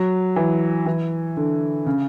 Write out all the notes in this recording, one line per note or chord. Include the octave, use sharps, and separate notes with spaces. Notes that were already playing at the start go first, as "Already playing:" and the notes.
Already playing: F#3
E3
E3
D3
C#3